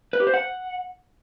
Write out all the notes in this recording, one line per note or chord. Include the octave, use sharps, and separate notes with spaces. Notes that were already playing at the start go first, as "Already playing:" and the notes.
B4
G4
C5
F#5